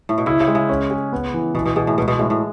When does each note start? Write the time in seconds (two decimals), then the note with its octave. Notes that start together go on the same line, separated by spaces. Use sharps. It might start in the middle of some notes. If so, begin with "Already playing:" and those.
0.09 A2
0.18 B2
0.26 C#3 E4
0.40 C#3
0.48 G#3
0.55 C#3
0.69 C#4
0.90 G#4
1.13 B3
1.34 E3
1.55 B2 E3
1.66 B2
1.76 B2 G#4
1.87 A2
1.98 B2 G#3
2.08 B2
2.19 A2 G#3
2.30 A2